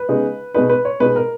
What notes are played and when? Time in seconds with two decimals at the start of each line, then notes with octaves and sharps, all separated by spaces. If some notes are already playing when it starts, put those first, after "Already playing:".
Already playing: B4
0.09 C#3 G#3 B3 D#4
0.54 B2 G#3 D#4 B4
0.70 B4
0.85 C#5
1.00 B2 G#3 D#4 B4
1.16 A#4